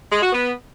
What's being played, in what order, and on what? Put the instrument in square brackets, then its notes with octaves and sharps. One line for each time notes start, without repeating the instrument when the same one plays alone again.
[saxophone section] G#3
F#4
B3